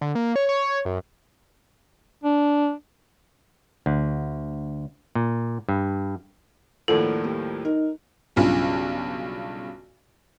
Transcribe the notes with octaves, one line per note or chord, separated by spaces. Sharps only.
D3
A#3
C#5
C#5
F#2
D4
D2
A#2
G2
D#2 A2 F3 A#3 D4 A4 F#5
G3 A#3
D#4 A#4
B1 G2 C#3 F4